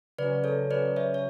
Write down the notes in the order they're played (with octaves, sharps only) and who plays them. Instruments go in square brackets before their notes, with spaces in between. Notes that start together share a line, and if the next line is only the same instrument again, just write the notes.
[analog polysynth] C#3 F#3 C#4 [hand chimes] B4 D5
[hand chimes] A4 C#5
B4 D5
C#5 E5
C#5